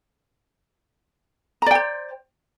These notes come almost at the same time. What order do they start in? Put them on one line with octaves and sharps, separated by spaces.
A#5 D5 G5 C5